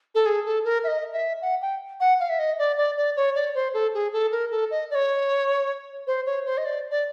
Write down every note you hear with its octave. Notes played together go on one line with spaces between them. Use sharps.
A4
G#4
A4
A#4
E5
D#5
E5
F#5
G5
F#5
F5
E5
D#5
D5
D5
D5
C#5
D5
C5
A4
G#4
A4
A#4
A4
D#5
D5
C#5
C5
C#5
C5
D#5
D5
D5